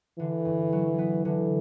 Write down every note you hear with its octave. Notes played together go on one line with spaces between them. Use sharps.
D3 E3
G2
F#3
B3
D3 E3